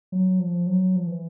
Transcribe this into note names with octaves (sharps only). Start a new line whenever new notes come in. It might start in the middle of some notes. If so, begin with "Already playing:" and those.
F#3
F3
F#3
F3
E3